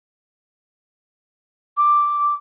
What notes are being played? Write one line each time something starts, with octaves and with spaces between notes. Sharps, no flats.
D6